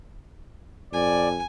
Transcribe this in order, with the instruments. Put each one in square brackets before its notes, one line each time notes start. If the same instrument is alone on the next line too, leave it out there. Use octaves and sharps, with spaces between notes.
[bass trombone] F2 [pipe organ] D5 [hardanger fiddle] G#5